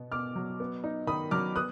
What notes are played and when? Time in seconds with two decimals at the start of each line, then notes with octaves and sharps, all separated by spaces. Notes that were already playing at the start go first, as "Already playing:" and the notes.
Already playing: B2 B3
0.12 B2 D6 F6
0.36 F#3
0.60 B3
0.84 D#4
1.07 D#3 B5 D#6
1.31 F#3 D6 F6
1.56 B3 D#6 F#6